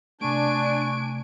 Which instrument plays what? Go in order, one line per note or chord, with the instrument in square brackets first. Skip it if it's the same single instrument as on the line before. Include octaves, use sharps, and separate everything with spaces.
[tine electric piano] C3 A3 [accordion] D4 [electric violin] G#5 D7 [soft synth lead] C#6